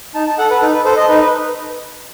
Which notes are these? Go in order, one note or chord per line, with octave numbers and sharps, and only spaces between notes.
D#4 A5
A5
A4 F#5
B4
D#4 A4
B4
A4 C5
D#5
D#4 B4
B4